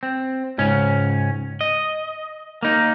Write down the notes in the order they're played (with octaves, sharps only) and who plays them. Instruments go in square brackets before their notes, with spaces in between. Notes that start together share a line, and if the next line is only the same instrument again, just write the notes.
[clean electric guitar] C4
C#2 G#2 C#4
D#5
A#3 D#4